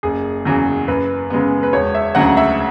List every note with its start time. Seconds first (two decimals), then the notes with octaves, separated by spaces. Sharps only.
0.03 F#1 G#4
0.45 E2 C#3 F#3
0.88 F#2 B4
1.30 C#3 G#3 B3
1.63 B4
1.73 E1 C#5
1.95 E5
2.15 D2 C#3 F#3 F#5
2.37 E5